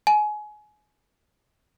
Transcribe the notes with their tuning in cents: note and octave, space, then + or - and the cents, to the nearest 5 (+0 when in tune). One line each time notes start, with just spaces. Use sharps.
G#5 +25